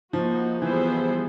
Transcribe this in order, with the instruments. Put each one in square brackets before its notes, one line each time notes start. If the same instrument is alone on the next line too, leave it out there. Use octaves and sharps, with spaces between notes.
[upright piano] F3 [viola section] A#3 D#4 F#4
[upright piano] E3 [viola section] G3 B3 E4 G#4 C5